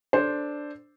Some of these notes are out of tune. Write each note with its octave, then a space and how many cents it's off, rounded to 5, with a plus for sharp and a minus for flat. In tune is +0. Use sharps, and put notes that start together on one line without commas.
D4 +0 A4 +0 C5 +0